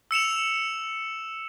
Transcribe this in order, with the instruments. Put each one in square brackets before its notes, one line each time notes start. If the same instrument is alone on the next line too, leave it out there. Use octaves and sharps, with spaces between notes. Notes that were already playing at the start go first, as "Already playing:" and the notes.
[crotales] E6 C#7 E7 F7